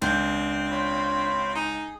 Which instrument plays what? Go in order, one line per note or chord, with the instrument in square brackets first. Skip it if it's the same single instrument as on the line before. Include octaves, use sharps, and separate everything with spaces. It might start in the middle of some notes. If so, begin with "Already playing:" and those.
[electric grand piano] C#2 G6 [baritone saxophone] C4 [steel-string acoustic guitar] D4
[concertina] F4 C#5 B5
[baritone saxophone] D#4 [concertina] G#4